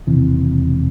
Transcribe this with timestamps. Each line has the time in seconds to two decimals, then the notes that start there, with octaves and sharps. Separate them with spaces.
0.07 E1 D#2 C3 E3